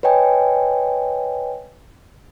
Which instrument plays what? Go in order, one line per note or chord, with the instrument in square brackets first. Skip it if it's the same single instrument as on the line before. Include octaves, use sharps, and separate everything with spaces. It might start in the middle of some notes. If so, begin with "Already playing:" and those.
[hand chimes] B4 C#5 D#5 G5 G#5